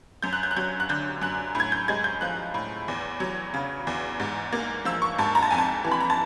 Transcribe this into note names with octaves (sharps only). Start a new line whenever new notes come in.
F#2 G6
F#6
G6
F#6
F#3 G6
F#6
D3 G6
F#2 F#6
A2
G#6
G6
G#3 G#6
G6
F3 F#6
A2
E2
F#3
C#3
E2
G#2
A#3
F3 E6
C#6
G#2 A5
A#5
A5
F2 G#5
A5
E3
B5
A#5
A5